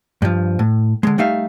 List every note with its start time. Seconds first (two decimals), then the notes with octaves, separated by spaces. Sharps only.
0.22 G2 F3
0.59 A2
1.03 D3 G#3
1.18 G3 A3 D#4 E5 F5